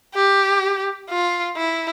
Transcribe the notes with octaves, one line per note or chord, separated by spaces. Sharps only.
G4
F4
E4